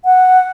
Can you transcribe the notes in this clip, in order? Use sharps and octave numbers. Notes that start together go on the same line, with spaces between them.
F#5